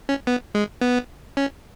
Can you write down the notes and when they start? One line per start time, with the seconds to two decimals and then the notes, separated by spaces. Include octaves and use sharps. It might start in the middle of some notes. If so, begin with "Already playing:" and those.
0.09 C#4
0.27 B3
0.55 G#3
0.81 B3
1.37 C#4